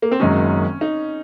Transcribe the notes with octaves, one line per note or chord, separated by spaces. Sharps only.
A#3
C4
F#1 F#2 D#3 G#3 C#4 D#4
D#4